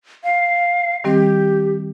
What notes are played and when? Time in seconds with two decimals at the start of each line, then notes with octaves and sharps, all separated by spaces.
0.24 F5
1.04 D#3 G3 C4 G4